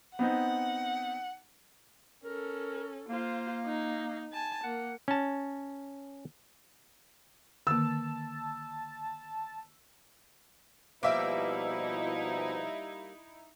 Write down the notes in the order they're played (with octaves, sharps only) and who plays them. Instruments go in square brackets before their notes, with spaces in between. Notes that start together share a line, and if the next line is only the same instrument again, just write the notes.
[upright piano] B3 C4 D#4 [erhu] F#5
[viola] C#4 A4 [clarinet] A#4
[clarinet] A#3 [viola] F4 C5
[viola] D#4
G#5 A5
[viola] A#3 [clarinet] F#5
[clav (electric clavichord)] C#4 A5
[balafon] D3 D#3 A#3 [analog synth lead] A5 [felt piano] E6
[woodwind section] B2 F3 [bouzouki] G3 A#3 [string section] D#4 E4 [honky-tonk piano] E5 D6